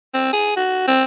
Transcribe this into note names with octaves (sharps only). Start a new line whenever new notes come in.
C4
G#4
F#4
C4